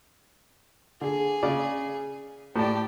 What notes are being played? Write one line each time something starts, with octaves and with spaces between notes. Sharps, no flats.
D3 G#4
C#3 D5
A2 G4 D5 A5